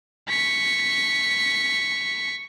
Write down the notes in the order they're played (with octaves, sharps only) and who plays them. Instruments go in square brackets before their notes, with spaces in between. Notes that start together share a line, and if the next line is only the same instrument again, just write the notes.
[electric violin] C#6 B6